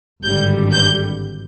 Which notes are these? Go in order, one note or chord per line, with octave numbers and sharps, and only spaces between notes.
G#1 G2 D3 G3 G6
G6